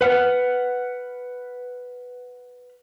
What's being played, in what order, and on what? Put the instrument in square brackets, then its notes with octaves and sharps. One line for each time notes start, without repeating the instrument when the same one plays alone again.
[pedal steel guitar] B4 F#5 F6